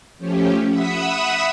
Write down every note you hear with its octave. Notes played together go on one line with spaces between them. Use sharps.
F3 A3 C#4 G4
E5 F#5 B5 D#6 E6